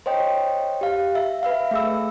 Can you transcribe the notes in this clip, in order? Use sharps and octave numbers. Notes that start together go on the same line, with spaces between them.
C5 C#5 D#5 G5
G4 F5
E5
B4 E5 F5
A3 G#4 E6